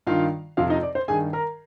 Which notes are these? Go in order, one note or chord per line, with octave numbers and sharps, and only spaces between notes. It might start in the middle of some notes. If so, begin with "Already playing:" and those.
G2 D#3 F4 F5
F2 C3 F3 F4 F5
D#4 D#5
D5
C5
G2 D#3 G#4 G#5
A#4 A#5